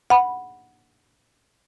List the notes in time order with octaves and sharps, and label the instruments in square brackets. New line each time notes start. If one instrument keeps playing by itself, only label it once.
[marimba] F#5 B5